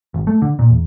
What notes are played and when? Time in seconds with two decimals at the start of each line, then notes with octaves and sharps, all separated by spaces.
0.14 G#1
0.27 A3
0.42 D3
0.59 A#2
0.70 E2